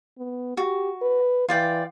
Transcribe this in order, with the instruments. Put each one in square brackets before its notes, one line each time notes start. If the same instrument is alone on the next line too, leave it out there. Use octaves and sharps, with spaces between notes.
[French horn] B3
[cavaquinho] F#4 [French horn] G4
[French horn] B4
[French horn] E3 [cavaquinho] F4 D5 G5